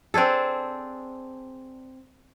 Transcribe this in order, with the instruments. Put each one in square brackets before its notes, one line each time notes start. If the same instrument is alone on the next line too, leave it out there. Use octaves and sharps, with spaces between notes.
[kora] C4 D4 G#4 A4